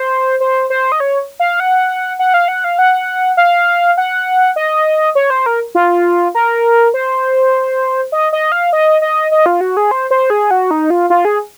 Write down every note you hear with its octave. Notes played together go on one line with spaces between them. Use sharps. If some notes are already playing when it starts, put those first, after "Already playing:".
Already playing: C5
C5
C5
D#5
C#5
F5
F#5
F#5
F5
F#5
F5
F#5
F5
F#5
D#5
C#5
C5
A#4
F4
A#4
C5
D#5
D#5
F5
D#5
D#5
D#5
F4
F#4
G#4
C5
C5
G#4
F#4
D#4
F4
F4
G#4